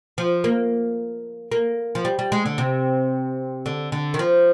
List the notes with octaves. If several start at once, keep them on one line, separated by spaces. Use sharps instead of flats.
F3
A#3
A#3
F3
G3
G3
G#3
D3
C3
D3
D3
D#3
F3